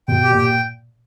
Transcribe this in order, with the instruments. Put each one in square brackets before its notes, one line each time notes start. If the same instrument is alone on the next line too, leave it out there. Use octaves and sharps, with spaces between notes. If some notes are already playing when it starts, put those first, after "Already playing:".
[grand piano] B2 [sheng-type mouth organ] G5
[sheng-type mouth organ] G4
[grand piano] A#2
[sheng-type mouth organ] G5